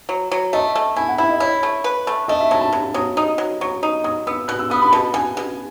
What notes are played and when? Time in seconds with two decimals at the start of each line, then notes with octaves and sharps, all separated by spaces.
0.09 F#3
0.31 F#3
0.53 A3 D#5
0.75 A3
0.96 E4 G#5
1.09 F#5
1.18 E4 E5
1.29 D#5
1.40 E4 C#5
1.63 A3
1.84 B4
2.07 A3
2.28 A3 D#5
2.40 E5
2.51 F#3 A5
2.61 A5
2.73 F#3 A5
2.94 F#3 D#6
3.17 D#4 D#6
3.38 F#3
3.61 F#3 C#6
3.83 D#4
4.04 F#3 D#6
4.27 B3 E6
4.48 B2 F#6
4.59 E6
4.70 B3 D#6
4.82 B5
4.92 B2 A5
5.14 B2 G#5
5.37 B2